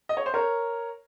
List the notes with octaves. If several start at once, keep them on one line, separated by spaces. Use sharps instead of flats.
D#5
C#5
C5
A#4 C#5